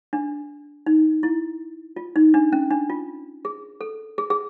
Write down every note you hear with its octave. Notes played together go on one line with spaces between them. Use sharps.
D4
D#4
E4
F4
D#4
D4
C#4
D4
F4
G#4
A4
G#4
G#4